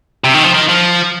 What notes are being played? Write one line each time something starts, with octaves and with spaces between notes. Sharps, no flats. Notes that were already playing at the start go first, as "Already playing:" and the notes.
C3
D#3
F3
D#3
F3